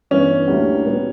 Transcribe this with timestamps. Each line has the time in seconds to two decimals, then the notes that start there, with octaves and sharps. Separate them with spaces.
0.11 G2 E3 B3 C#4
0.48 D2 D3 G3 A#3 E4
0.85 A#2 G3 B3